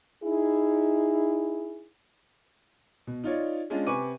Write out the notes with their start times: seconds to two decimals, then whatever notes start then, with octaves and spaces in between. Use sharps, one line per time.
0.24 D#4 E4 G#4
3.07 B2
3.24 D#4 F4 C#5 D5
3.70 G#3 C#4 D4 F4
3.86 C3 B4 G#5 C#6 D6 D#7